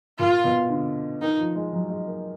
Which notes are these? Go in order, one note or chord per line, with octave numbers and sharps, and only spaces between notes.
A#2 F4
B2
D3
D#3 D#4
F3
G#3
F#3
G#3
A#3